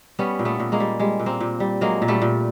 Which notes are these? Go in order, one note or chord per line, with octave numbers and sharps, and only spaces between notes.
G3 B3 C#4
A#2
A3 B3
A#2
G#3 A#3
G3
G3 G#3
A#2
A#3 C4
A#2
G3
F#3 G#3 A#3
A#2
G3 A3
A#2